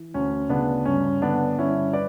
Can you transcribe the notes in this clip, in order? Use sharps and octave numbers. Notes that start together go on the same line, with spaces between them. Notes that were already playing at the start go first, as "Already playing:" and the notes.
Already playing: E3
D2 C#4
C#3 B3 D4
G2 C#4
D3 B3 D4
G2 C#4 E4
B4 D5